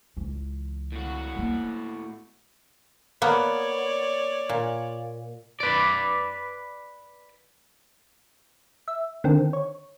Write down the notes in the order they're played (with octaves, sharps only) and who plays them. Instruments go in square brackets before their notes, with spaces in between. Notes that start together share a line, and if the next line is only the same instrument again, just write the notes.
[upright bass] C#2 E3
[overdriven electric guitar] A2 F#4
[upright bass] A#3 B3
[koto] A#3 B3 [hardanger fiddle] C#5 D5
[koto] A#2
[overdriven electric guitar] B4 D5
[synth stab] E5
D3 D#3 C4
C#5